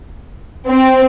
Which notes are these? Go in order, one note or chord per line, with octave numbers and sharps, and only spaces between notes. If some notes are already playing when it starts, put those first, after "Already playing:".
C4